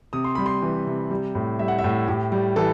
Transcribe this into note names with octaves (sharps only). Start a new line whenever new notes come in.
C3 D#6
C6
G3 B5
C6
E3
C3
G3
A2
G3 E5
F#5
E5
A2
A2 G4
G3
E3 A4